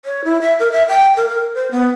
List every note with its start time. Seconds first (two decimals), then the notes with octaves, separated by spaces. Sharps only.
0.05 C#5
0.25 E4
0.41 E5
0.60 A#4
0.72 E5
0.89 G5
1.17 A#4
1.29 A#4
1.54 C5
1.71 B3